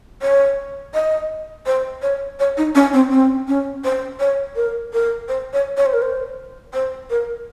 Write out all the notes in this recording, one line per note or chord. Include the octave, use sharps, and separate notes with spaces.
C#5
D#5
C5
C#5
C#5
D#4
C#4
C4
C4
C#4
C5
C#5
A#4
A#4
C5
C#5
C#5
C5
A#4
C5
C5
A#4